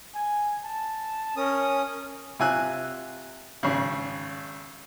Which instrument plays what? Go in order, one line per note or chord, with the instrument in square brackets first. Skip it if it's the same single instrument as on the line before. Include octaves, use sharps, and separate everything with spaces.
[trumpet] G#5
A5
[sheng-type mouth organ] C#4 D#6 [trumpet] A#4
[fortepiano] C3 F4 G#5 E6 F#6
G#1 C#3